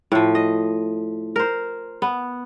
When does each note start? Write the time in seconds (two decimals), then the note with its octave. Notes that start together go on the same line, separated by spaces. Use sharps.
0.12 A2 F3
0.35 D#5
1.36 A#4 C5
2.02 B3